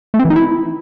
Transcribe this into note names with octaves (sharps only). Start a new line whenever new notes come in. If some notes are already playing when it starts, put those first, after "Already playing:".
A3
C4
E3
D#4
E4